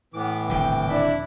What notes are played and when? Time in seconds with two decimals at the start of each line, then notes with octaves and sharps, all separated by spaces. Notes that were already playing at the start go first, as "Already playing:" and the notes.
0.14 A2 E3 B3 D6
0.49 D#1 F2 D3 G5
0.88 D4 E4